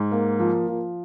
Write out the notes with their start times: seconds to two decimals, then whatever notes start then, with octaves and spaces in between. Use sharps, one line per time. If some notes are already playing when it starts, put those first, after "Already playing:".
Already playing: G#2
0.11 A#3
0.39 F3
0.68 F3